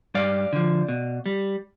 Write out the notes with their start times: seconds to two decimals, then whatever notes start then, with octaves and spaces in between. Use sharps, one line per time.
0.14 G2 D5 F5
0.53 D3 F3
0.88 B2
1.26 G3